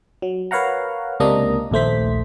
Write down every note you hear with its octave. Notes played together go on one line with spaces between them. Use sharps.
F#3
A#4 B4 C#5 F5 F#5 A#5
C#2 C3 A#3 D4 D#5 A#5
A#1 D#2 A3 C5 B6